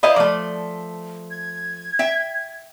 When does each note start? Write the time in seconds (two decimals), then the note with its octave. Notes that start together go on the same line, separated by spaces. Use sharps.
0.03 E4 C5 D5 D#5 F5
0.16 F3 A3 D5
1.31 G#6
1.99 E5 G5